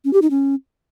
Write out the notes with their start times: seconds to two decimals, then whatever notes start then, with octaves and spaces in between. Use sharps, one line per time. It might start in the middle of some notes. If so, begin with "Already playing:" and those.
0.05 C#4
0.13 G4
0.22 D#4
0.30 C#4